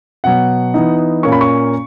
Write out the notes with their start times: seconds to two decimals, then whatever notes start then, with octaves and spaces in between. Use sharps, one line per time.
0.24 B2 F#3 B3 F#5
0.74 E3 B3 D#4
1.23 A#2 A#3 C#4 C#6
1.32 B5
1.41 C#6